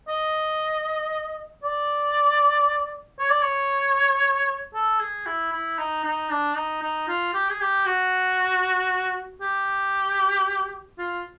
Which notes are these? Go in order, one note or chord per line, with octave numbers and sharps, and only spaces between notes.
D#5
D5
C#5
D5
C#5
A4
G#4
E4
E4
D#4
D#4
D4
D#4
D#4
F4
G4
G#4
G4
F#4
G4
F4